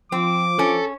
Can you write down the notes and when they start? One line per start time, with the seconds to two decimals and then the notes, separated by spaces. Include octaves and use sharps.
0.12 F3 C4 D6
0.59 C#4 A4